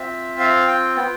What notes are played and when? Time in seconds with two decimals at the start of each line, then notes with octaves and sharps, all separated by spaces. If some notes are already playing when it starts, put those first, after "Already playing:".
Already playing: C4 F4 E5
0.40 F5
0.68 G5
0.97 B3 F4 G5